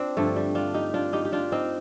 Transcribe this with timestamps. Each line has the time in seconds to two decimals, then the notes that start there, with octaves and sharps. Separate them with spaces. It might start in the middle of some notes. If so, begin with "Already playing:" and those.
Already playing: C4 D4 F4
0.17 G2 D3 F3 A3
0.36 G3
0.55 D4 F4
0.74 D#4 G4
0.94 D4 F4
1.13 D#4 G4
1.25 G4
1.32 D4 F4
1.52 C4 D#4